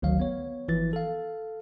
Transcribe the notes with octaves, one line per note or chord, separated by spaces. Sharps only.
G#1 D2 D#3 F#3 F5
B3 C#5
G1 E3 F3 A6
A4 F5